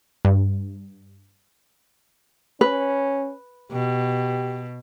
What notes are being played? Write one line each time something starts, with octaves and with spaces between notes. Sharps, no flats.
G2
C#4 B4
B2 G4